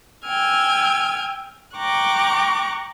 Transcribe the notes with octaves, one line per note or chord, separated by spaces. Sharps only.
G5 G#5 E6 F6 G#6
G5 A#5 C#6 D6 F#6